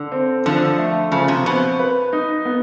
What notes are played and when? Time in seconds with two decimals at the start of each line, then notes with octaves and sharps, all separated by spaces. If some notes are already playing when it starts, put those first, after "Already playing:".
Already playing: D3
0.12 C4
0.46 D3 F3
0.78 A3
1.12 C#3 F3
1.28 C3
1.46 B2 C4
1.79 B4
2.13 D#4
2.45 B3